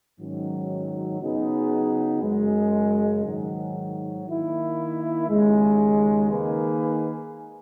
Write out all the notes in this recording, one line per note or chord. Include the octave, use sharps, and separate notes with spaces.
G#2 D#3 F#3 C#4
C#3 F#3 B3 D#4 G#4
F#2 C#3 G#3
G#2 D#3 F#3
D#3 A#3 E4
D#2 C#3 G#3
D#3 A#3 D#4 G#4 B4